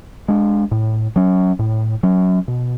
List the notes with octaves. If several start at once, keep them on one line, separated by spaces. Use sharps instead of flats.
G#3 D4
A2
F#3 C#4
A2
F#3 C#4
B2